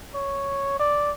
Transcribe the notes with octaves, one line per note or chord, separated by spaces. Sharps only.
C#5
D5